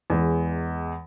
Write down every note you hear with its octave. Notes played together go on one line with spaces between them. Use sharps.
E2 G#3